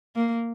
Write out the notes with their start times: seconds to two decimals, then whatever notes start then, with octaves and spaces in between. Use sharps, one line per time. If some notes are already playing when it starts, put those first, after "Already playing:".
0.16 A#3